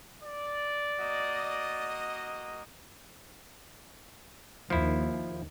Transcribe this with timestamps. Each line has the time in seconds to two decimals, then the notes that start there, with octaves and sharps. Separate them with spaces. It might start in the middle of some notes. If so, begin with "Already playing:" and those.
0.23 D5
0.99 A#3 F#4 D#5
4.70 D#2 F3 E4